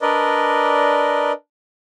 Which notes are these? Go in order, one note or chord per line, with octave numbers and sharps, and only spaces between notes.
D4 A#4 B4 D5 D#5